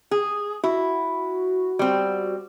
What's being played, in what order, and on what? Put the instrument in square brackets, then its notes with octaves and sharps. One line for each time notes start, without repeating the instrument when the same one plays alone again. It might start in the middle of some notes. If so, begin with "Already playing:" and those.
[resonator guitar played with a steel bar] G#4
[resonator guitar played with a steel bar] E4 [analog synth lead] F#4
[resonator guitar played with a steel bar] G3 C4